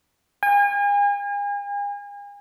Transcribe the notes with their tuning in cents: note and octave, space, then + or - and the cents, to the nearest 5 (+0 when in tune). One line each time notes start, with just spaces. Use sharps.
G#5 -40